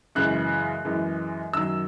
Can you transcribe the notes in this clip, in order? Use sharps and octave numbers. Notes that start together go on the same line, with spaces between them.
F#2 C#3 E3 G#3 F#6
F#2 E3 G#3
F#2 D#3 F#3 E6